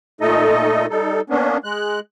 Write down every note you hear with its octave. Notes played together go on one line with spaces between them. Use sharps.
A#2 A3 D#4 A4 D#5
G3 D#4 A4
A#3 B3 C#4 D4
G#3 F#6